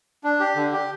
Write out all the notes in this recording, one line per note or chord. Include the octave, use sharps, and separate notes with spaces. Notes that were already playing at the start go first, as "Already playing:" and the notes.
D4
G4
D3
G4